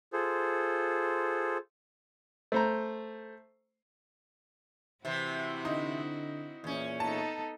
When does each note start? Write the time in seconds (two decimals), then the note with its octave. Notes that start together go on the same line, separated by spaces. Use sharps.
0.13 F4 G#4 A4 C5
2.52 A3 C5 A#5
5.05 C3 E3 C4 E4 F#4
5.65 D3 D#4
6.64 E2 A#2 C#4
7.00 B3 D#4 A4 A5